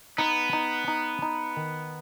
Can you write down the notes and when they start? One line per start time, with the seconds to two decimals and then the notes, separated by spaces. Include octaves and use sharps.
0.18 B3 D#4
0.53 D#4
0.88 D#4
1.22 D#4
1.57 D#3